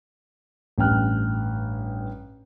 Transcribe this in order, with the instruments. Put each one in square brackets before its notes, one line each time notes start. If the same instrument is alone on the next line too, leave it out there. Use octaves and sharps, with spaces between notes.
[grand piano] A1 G2 G5 F6 F#6